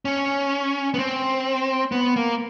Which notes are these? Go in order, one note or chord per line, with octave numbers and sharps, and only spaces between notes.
C#4
B3
C4
B3
A#3